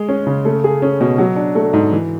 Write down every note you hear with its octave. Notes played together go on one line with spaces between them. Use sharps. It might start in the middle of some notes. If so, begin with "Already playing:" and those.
Already playing: G#3 G#4
C#4
C#3
A3
G#4
C#4
B2
F#3
D4
A3
G#2
E3